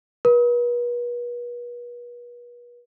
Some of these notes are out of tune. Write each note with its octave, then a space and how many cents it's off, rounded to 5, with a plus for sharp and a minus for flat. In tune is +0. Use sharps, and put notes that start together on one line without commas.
B4 -40